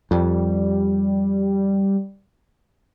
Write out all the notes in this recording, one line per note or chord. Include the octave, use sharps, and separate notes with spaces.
F2 G3